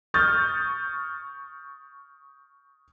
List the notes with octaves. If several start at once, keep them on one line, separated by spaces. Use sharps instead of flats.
C#6 D#6 F6 G6 A6